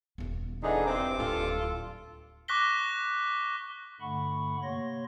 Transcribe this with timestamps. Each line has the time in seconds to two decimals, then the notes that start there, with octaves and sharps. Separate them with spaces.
0.18 D#1 B3
0.63 D3 E3 D#4 G#4
0.87 G2 C4 D6
1.19 D1 D4 F4 A4
2.48 C#6 D6 F#6 A#6 B6 G7
4.01 G2 D3 A3 F#5 B5 C#6
4.63 C3 A#3 C#5 C6 A#6